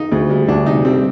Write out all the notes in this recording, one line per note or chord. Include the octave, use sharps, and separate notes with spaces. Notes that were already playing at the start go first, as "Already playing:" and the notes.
Already playing: D#4
D2 G#3
G3 G#3
D2 D4
C3 D#4
G3 C4